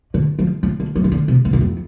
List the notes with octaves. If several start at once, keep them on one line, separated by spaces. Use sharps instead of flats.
D3
F3
F3
D3
F3
E3
D3
C3
F2
E2
F2